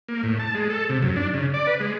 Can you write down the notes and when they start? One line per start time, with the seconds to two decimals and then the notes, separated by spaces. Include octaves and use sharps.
0.08 A#3
0.23 A2
0.39 A5
0.55 G#3
0.70 A4
0.89 C3
1.02 F#2
1.16 D4
1.33 C#3
1.54 D5
1.67 B4
1.80 G#3